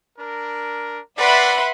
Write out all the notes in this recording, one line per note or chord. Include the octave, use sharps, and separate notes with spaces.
D4 A#4
B4 D5 E5 F#5 B5 C6